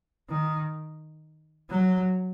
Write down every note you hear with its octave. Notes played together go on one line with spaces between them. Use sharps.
D#3
F#3